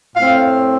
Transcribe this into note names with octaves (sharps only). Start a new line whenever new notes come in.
A2 A3 C4 F5